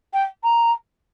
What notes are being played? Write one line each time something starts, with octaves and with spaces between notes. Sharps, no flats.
G5
A#5